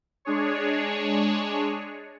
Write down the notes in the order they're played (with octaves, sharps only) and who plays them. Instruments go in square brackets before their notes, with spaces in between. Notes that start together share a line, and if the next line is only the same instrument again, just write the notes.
[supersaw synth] G#3 D4 G#4 C#5